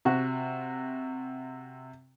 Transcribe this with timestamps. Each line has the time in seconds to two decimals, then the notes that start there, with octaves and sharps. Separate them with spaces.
0.05 C3 F#4